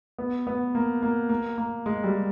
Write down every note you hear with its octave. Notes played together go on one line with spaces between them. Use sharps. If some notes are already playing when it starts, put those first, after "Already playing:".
B3
B3
A#3
A#3
A#3
A#3
G#3
G3